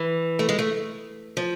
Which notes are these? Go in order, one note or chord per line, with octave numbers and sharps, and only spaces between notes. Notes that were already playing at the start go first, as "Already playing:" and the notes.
Already playing: E3
A3
G#3
A3
F3